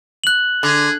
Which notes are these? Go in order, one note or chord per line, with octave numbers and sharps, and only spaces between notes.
F#6 F#7
D3 G#4